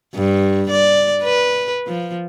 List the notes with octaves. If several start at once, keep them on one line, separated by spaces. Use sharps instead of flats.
G2
D5
B4
F3